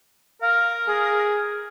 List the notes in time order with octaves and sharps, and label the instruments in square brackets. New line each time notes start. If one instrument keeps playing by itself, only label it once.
[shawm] A#4 [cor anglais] F5
[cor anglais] G#4